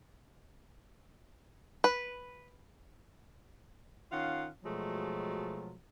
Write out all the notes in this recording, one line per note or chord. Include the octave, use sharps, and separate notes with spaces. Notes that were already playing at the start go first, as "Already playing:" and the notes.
B4
D#3 C#4 F4 F5 F#5
B2 F3 F#3 G#3 A3